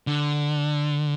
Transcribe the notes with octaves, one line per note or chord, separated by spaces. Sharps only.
D3